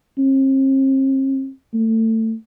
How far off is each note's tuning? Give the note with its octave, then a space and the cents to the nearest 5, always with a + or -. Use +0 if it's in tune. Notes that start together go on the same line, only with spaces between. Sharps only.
C4 +40
A3 +25